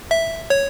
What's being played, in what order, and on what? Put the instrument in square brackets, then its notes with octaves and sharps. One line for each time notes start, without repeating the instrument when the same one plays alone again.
[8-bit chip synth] E5
C#5